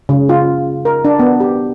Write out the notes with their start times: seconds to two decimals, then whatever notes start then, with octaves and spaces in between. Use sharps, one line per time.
0.09 C#3
0.29 F4
0.85 A#4
1.05 D4
1.19 B3
1.40 G4